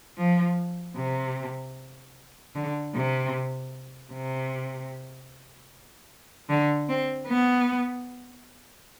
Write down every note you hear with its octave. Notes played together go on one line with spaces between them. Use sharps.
F3
C3
D3
C3
C3
D3
C4
B3